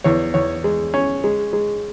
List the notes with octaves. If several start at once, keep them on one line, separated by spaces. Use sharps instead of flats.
E2 C#5
E2 C#5
G#3
C#4
G#3
G#3